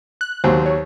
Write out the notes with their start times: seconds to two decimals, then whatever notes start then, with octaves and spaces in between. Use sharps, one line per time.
0.21 F#6
0.44 D#2 F#3 C5
0.66 C#5